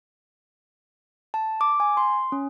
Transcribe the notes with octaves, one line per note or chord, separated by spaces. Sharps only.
A5
D6
G#5
C6
C#4